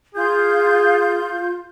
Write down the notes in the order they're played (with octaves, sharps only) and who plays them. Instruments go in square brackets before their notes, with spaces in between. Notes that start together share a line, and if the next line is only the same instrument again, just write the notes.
[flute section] F4 G6 [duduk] G#4